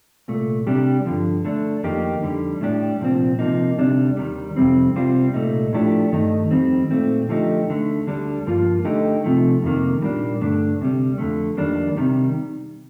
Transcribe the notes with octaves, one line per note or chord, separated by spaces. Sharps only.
C2 A#2 A3
C3 G3 D4 G4
G2 D3 F3
D3 A3 D4
F2 D#3 A#3 D#4 G4
F2 D3 G3
A2 G3 D4 G4
C2 A#2 F3 C4
C3 F3 A#3 D#4
D2 C3 G3 D4
D#2 D#3 G3
F2 C3 G3 C4
C2 C3 G3 C4 F4
C2 A#2 A3 D#4
A2 F3 A3 D4 G4
G2 D#3 A3 D#4
F2 D#3 G3 C4
A#2 A3 C4
D3 F3 A3 D#4 G4
D2 D3 A3
D2 D3 G3 D4
G2 F3 A#3 F4
D3 A3 D#4 G4
C2 C3 F3 A3
F2 C3 D#3 A#3
A#2 G3 A#3 D4
G2 D3 A3 D4
D2 C3 G3
F2 D3 A3
F2 D#3 G3 A#3 D4
C3 D#3 G3